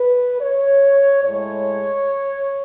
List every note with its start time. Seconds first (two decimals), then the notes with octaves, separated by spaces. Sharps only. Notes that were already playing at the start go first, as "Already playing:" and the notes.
Already playing: B4
0.40 C#5
1.24 A2 G#3 C#5